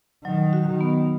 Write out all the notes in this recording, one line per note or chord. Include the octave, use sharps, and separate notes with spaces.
D#3 F#3
F#4
D#3
B3